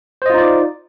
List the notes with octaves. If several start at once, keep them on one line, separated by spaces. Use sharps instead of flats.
D#4 F4 C5 D5 D#5